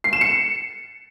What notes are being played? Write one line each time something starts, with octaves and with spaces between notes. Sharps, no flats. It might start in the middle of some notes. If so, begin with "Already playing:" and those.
C7
E7
C#7